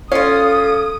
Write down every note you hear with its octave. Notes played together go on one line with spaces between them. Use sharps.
C#4 F4 A4 F5 D#6